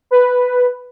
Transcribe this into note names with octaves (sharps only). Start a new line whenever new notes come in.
B4